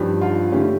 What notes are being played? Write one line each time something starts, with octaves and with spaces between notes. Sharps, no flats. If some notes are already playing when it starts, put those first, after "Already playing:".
Already playing: G2 F3 C#4 G4
F4
D3 A3 C#4 G4